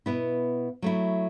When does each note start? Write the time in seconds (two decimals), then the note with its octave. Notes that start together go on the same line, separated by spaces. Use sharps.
0.06 B2 B3 E4
0.82 F#3 A3 E4